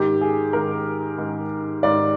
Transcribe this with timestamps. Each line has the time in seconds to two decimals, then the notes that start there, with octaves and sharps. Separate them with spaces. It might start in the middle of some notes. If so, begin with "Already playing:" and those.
Already playing: G#2 D#3 G4
0.21 G#4
0.53 G#2 D#3 A#4
1.18 G#2 D#3
1.83 G#2 D#3 D5